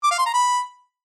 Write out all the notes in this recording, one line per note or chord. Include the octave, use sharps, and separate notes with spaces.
D6
F5
C6
A#5
B5